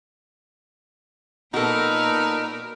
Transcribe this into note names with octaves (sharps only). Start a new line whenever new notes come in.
A#2 B3 D#4 F#4 A4 A#4